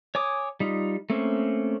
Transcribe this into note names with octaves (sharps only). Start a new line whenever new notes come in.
C#5 G#5 D6 D#6
G3 D#4 F4
A3 A#3 C4 C#4